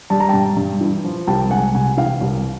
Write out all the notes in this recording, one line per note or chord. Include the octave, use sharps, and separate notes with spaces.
G3 A5
A#5
G2 G5 A5
G2
E3
F3
C2 G5 A5
G#3 F#5 G#5
C3 F#5 G#5
E3 F5 G5
C2